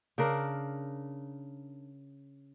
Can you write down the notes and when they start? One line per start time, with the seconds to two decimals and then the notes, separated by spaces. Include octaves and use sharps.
0.18 C#3 D4 A#4